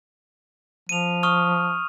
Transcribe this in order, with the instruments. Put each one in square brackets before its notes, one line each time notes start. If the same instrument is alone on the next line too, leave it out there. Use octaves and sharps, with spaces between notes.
[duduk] F3 [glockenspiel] D#7 F7
[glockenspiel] C#6 D#6 F6